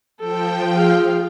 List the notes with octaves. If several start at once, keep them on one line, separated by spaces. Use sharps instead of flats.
F3 A4 G5
F4 G#4 F5